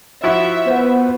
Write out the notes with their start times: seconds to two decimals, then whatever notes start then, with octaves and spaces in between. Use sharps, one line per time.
0.23 F3 E4 F#4 E5
0.67 B3 C5